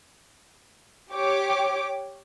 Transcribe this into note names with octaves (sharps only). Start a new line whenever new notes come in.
G4 C#5 D6